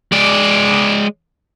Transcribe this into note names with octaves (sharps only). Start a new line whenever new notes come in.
G#3 D5